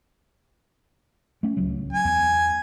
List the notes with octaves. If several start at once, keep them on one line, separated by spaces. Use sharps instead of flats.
A3 C#4
D1 C#2 F#3
G#5
E2